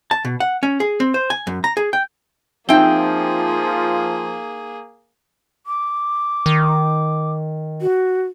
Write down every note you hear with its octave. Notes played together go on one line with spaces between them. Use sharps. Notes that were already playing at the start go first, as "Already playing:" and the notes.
A5
B2
F#5
C#4
G#4
C4
C5
G#5
F#2
A#5
G#4
G5
F3 A#3 C4 D#4 G#4 E5 G5 G7
D6
D#3
F#4